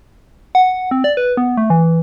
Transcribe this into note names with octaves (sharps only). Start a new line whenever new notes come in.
F#5
C4
D5
B4
B3
A3
E3